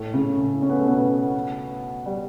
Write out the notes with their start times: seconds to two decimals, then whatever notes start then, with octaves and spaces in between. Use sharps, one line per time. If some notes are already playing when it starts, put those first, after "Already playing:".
Already playing: A2 A3
0.14 C#3 C#4
0.38 A2 A3
0.62 C#4
0.70 B3
0.79 A3
0.87 B2 B3
2.06 G3